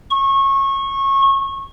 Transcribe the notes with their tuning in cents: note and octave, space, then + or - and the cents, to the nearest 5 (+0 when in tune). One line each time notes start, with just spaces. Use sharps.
C#6 -25